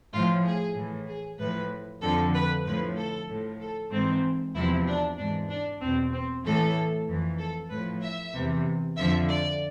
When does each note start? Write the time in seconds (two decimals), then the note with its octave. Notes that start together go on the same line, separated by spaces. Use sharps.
0.13 A2 F3 F4
0.44 G#4
0.76 A2 E3
1.07 G#4
1.39 A2 F3 B4
2.02 F2 D3 F3 A4
2.34 B4
2.65 A2 F3 B4
2.97 A4
3.29 A2 F3
3.60 A4
3.91 G#2 E3 C4
4.55 E2 C3 F3 E4
4.87 D4
5.18 G#2 E3 D4
5.49 D4
5.80 E2 B2 C4
6.12 C4
6.44 A2 E3 A4
7.08 F2 E3
7.39 A4
7.70 A2 F3 B4
8.01 E5
8.34 E2 C3 E3
8.97 F2 D3 F3 E5
9.29 D5